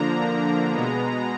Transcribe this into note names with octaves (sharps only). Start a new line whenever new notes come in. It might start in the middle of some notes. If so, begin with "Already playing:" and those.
Already playing: D3 F3 A#3 D4 A#5
B2 G#3 B3